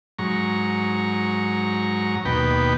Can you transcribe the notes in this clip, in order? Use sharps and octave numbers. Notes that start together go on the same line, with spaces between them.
G#2 F#3 A#5 C#6
D#2 B2 B4 G5